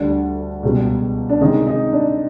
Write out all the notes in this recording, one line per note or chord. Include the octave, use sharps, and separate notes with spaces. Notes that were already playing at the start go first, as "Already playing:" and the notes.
Already playing: D2 D3 G3 D4
C#2 B2 G3
D4
C3 D#3 G#3 C#4 D#4
D#4
D4